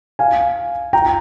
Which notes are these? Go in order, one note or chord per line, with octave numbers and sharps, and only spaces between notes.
F5 G#5
G5 A#5